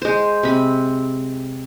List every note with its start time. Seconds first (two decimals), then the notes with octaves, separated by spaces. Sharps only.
0.02 G#3 C5
0.43 C3 B5